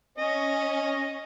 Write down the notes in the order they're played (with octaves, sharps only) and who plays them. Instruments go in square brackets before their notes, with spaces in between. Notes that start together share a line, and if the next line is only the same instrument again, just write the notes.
[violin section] C#4 [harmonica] D#5